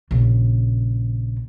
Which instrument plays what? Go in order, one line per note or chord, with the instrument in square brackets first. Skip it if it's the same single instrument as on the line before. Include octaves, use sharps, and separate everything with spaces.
[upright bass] A#1 C#3